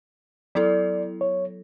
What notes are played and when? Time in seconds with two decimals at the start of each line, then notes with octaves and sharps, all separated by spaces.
0.55 F#3 B3 E4 A4 D5
1.21 C#5